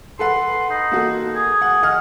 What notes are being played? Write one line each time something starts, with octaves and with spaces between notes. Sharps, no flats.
A4 B4 F#5 C6
D#4
A#3 F#4 A4
G#4
F#5
D#5 F#5 F6